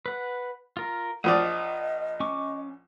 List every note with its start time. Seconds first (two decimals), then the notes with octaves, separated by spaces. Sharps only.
0.06 B4 F#5
0.77 F4 A#4
1.24 A#1 F3 D5 D#6
1.41 D#5
2.20 C#4 C#6 D6